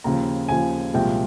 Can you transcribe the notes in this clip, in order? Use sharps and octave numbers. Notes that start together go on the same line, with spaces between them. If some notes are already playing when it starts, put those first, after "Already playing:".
D#2 C#3 F3 A#5
D#2 C#3 F3 G#5
C2 A#2 F3 G#3 G5